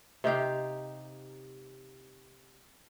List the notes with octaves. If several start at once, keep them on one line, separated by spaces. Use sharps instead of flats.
C3 D#4 G4 F5